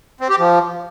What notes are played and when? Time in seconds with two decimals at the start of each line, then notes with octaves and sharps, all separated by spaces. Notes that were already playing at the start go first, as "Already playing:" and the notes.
0.20 C4
0.30 G4
0.39 F3